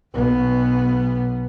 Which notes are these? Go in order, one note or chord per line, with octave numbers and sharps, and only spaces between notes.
B1 B3